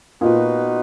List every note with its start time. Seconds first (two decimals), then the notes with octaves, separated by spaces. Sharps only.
0.21 A#2 B3 D#4 F#4 B4